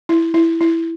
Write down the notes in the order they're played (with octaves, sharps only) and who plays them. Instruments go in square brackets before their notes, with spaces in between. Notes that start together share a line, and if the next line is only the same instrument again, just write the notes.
[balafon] E4
E4
E4